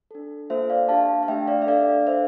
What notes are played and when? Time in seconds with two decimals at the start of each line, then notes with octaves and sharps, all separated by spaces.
0.11 D4 A4
0.50 A#3 F4 A4 C5 E5
0.70 D5 F5
0.88 D4 G4 F5 A5
1.23 F5
1.28 A3 D4 G4 E5 G5
1.47 D5 F5
1.62 E5
1.67 D4 A4 D5 F5
2.07 D4 A4 C5 E5